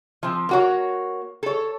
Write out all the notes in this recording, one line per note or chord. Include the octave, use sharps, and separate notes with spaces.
F3 C4
A#3 F#4 C#5
A4 C#5